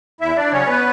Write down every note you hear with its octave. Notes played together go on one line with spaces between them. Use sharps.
E2 E4 E5
D4 D5
C#3 F#3 C#4 C#5
B3 B4